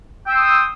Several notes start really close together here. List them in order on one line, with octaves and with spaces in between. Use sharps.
G5 E6 C6 D#6